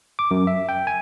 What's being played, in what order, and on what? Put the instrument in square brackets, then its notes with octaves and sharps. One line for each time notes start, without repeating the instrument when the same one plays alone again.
[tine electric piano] D6
F#2
E5
G5
G#5